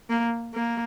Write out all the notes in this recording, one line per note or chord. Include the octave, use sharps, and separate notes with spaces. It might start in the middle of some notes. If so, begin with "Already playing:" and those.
A#3
A#3